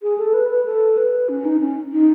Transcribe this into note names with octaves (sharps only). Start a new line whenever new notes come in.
G#4
A4
B4
B4
A4
B4
C#4
D#4
C#4
D#4